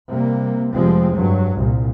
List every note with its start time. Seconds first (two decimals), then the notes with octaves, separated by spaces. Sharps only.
0.10 C3 G3 A#3
0.73 F1 F3 G3 G#3 C4
1.16 G2 F#3
1.58 C2 A#2